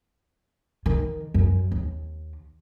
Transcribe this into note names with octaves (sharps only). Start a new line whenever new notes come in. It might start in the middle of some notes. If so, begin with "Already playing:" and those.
D#3
F#2
D#2